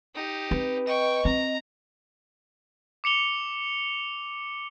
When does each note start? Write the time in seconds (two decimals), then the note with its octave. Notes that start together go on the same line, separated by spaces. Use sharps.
0.15 D#4 G4
0.51 C4 B4
0.87 D#5 G5 C#6
1.25 C4 A#5
3.04 D6 C#7 F7 G7